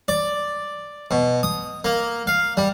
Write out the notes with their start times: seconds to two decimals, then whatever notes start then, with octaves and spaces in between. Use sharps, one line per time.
0.08 D5
1.11 B2
1.43 D#6
1.84 A#3
2.27 F5
2.57 G3